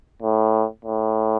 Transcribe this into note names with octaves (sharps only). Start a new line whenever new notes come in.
A2
A2